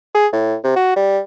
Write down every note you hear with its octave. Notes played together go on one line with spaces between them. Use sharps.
G#4
A2
C3
F#4
G3